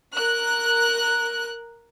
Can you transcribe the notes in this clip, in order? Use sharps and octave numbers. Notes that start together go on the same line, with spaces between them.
A#4 F#6